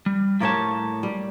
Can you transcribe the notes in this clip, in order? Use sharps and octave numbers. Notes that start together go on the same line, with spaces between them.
G3
A2 A#3 G4 C#5 A5
G3